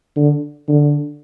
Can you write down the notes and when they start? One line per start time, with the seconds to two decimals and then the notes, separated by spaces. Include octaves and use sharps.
0.16 D3
0.68 D3